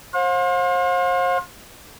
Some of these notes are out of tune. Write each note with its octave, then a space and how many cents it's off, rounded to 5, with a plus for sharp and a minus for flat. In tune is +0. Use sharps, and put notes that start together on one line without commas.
C5 +35 F5 +45